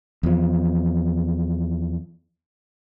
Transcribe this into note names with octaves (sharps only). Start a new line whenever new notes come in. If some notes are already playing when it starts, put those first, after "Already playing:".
E2 F3